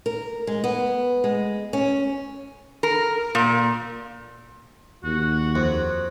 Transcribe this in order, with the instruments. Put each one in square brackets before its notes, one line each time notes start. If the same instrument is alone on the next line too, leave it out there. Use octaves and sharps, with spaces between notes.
[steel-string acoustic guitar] A#4
G#3
B3
G#3
C#4
[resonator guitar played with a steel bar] A#4
A#2
[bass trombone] D#2 [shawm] F#4
[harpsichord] F2